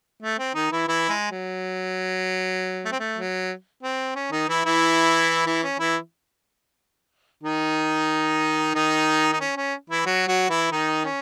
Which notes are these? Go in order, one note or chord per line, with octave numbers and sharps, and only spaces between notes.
A3
C4
D#3 D#4
E3 E4
E3 E4
G#3
F#3
A3
C4
A3
F#3
C4
C#4
D#3 D#4
E3 E4
E3 E4
E3 E4
C#4
E3 E4
D#3 D#4
D#3 D#4
D#4
C#4
C#4
E3 E4
F#3 F#4
F#3 F#4
E3 E4
D#3 D#4
C#4